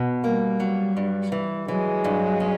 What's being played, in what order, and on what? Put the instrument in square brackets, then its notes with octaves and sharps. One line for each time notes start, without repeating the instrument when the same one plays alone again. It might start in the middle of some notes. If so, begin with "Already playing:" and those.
Already playing: [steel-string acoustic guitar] B2
[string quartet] G3 [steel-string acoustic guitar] A#3
[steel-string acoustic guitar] F#3
G2
E3
[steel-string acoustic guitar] E3 [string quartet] F#3 G#3
[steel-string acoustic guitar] G2
C#4